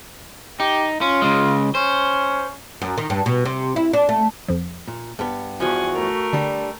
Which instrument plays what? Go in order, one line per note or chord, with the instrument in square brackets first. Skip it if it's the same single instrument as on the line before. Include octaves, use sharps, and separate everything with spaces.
[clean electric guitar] D#4 [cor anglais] G4
[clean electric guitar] C#4 [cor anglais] F4
[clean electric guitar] C#3 G#3
[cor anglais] C#4 [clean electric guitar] C5
[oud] F#2
D#3
G2
B2
C3
E4
D4
A3
[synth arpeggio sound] F2 F3
[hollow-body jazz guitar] A#2
G2 B3
[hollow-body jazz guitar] E2 G2 F3 [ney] F#4 [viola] F#5 G#5
[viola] A3 A#4
[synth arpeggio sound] D3 [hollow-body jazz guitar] G3 D4